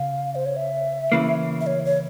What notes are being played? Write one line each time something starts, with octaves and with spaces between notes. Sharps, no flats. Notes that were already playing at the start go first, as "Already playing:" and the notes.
Already playing: C#3 F5
C5
C#5
E5
C#3 E3 A#3
E5
C#5
C#5